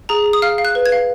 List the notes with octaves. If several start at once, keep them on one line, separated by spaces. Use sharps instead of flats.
G#4 A#5
G#4
D#6
F5 F6
F5
F#6
B4
G#6
F5